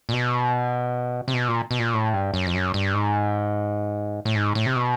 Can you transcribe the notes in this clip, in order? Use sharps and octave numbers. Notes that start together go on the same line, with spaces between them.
A#2
B2
C3
B2
A#2
B2
A#2
A2
G2
F#2
F2
F#2
G2
G#2
A2
G#2
A2
C3
B2